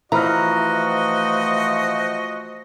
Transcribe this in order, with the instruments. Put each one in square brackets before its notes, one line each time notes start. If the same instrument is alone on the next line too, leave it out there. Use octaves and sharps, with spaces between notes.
[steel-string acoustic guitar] E3 [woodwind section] F3 A3 F#4 [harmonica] D#5 [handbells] A#5 B5 F6